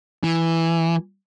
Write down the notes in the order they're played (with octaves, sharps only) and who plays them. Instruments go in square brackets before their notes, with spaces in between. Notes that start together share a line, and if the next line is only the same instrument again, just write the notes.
[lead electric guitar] E3